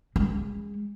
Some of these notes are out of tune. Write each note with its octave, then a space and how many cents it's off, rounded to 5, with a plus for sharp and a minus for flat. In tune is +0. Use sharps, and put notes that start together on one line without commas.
G#3 -25